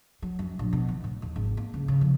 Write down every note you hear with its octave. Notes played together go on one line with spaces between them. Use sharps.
F#3
F#2
A#1
B2
E3
A2
D#2
G#1
A#3
C#2
C#3
F2